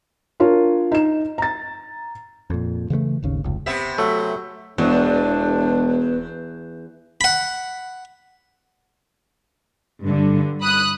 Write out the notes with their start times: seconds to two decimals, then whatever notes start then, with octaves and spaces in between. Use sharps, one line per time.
0.40 D4 F4 A#4 C#5
0.92 D#4 E7
1.38 A#5 A6
2.50 F2 A#2
2.90 C#3 E3 G3 A3
3.22 G#1 D#2 C#3
3.44 F1 C#2
3.66 C3 B3 E5
3.98 F#3 A3
4.78 E1 E2 B3 D4
7.21 F#5 B5
10.05 G2 D3
10.61 B5 D#6 F#6